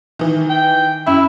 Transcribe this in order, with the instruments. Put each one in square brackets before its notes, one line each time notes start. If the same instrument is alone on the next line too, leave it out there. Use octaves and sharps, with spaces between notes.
[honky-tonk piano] D#3 E3
[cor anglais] G5
[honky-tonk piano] F#2 E5 [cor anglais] E4